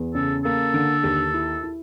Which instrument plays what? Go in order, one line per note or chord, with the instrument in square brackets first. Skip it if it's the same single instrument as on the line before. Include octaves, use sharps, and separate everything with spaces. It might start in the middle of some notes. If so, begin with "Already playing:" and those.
Already playing: [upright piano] E2
[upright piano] C#3 [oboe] A4
[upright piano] A#3 [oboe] A4
[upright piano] D3
D#2
E4
E4